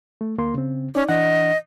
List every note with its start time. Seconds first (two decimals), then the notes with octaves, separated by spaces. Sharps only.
0.21 A3
0.38 D2 A#3 C6
0.54 C#3 C4
0.95 C#4 D#4 D5
1.09 E3 D4 D#5 F#5